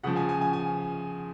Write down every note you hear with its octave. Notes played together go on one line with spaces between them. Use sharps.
C#3 F3 F#5
G#5
G#5
G#5
G#5